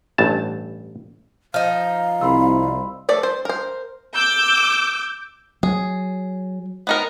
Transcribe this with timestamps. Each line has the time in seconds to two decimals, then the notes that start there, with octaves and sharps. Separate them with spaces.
0.18 A1 G2 A5
1.54 F3 D#4 F5 F6
2.21 C2 B5 C6 E6
3.09 F3 A3 A4 D5
3.23 C5
3.45 A#4 C5
4.14 D6 E6 G6
5.63 F#3 G#4
6.87 B3 D#4 A#4